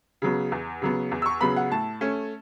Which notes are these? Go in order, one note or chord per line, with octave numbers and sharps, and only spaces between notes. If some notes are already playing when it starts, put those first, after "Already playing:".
C#3 F#3 B3
E2
C#3 F#3 B3
E2
E6
C#6
C#3 F#3 B3 B5
F#5
A2 A5
A3 C#4